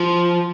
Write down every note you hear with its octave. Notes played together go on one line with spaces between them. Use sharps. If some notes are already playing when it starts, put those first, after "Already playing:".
Already playing: F3